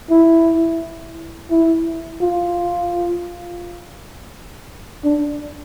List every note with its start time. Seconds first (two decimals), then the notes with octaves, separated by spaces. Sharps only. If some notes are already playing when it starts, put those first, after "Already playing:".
0.10 E4
1.51 E4
2.21 F4
5.04 D4